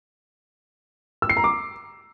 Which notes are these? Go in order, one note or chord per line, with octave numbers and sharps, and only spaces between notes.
E6
C7
A#5
D6